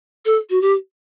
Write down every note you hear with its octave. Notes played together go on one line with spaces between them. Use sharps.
A4
F#4
G4